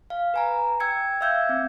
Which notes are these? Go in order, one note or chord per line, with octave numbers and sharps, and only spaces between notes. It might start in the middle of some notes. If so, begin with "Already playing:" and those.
F5
B4 G#5 A#5
G5 E6 G#6 C#7
E5 F5 E6 G6 G#6
C4